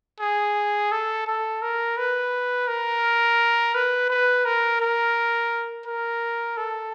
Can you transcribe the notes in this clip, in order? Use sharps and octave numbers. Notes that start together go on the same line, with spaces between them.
G#4
A4
A4
A#4
B4
A#4
B4
B4
A#4
A#4
A#4
A4